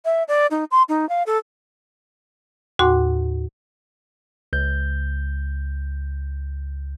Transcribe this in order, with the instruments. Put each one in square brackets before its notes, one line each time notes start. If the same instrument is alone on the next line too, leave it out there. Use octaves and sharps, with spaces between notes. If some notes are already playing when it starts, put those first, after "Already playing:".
[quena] E5
D5
D#4
C6
D#4
F5
A4
[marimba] D#2 A2 F#4 F#5 C6 D6
[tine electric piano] C#2 G6